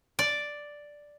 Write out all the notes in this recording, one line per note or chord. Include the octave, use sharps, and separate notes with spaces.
D5